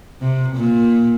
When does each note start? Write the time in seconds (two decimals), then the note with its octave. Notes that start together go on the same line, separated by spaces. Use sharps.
0.21 C3
0.56 A#2